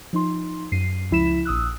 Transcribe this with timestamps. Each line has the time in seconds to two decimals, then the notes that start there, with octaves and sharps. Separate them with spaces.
0.13 F3 D#4 C6
0.72 F#2 C7 D#7
1.11 C#2 F3 E4 B5 B6 E7
1.45 A#1 D#6 E6 F#6